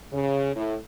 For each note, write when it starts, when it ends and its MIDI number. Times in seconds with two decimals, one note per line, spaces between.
0.13 0.50 49
0.56 0.77 45